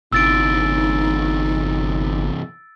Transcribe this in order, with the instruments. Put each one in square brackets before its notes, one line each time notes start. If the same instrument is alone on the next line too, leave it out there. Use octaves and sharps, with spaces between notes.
[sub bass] G1 [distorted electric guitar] C3 E3 [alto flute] D#4 [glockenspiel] E6 A6 D7